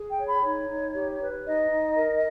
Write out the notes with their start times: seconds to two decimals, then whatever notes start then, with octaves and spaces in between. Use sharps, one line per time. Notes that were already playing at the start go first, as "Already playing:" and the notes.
Already playing: G#4
0.09 G5
0.19 C#5
0.27 B5
0.43 D#4 C#5
0.69 D#4
0.94 G4
1.21 B4
1.45 D#4 D#5
1.71 D#4
1.96 A#4